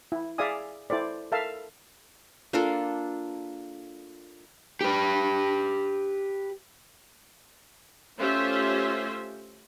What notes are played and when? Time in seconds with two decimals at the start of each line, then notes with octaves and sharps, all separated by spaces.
0.12 E4
0.38 G#4 D5 E5 F5 G#5 D#6
0.90 E4 A4 C5 D5
1.32 A4 A#4 E5 F5 A5
2.53 A#3 D4 F4 A4
4.81 G4 B4
8.18 A3 C#4 F4 G4 C5 E5